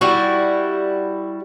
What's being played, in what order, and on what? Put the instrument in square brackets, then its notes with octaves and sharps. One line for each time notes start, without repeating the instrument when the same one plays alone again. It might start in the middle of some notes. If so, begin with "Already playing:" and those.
[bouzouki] G3 E4 F#4